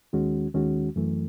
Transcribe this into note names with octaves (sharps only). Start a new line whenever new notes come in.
D#2 D#3 G#3 C#4 F#4
D#2 D#3 G#3 C#4 F#4
F#2 E3 A3